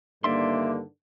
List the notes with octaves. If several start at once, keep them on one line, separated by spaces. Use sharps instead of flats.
G2 D3 D#3 A#3 D5 E5 C6